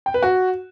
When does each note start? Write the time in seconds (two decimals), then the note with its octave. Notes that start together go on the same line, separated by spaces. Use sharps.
0.06 G5
0.14 B4
0.23 F#4